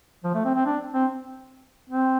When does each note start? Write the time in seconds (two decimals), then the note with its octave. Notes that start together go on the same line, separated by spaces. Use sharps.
0.24 F3
0.34 A3
0.45 C4
0.55 C4
0.66 D4
0.93 C4
1.90 C4